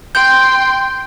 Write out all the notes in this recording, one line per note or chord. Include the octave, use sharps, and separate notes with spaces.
G5 C6 G6